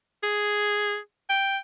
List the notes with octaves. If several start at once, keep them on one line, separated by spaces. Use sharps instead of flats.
G#4
G5